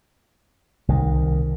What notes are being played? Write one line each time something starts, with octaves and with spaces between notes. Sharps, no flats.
C2 D#3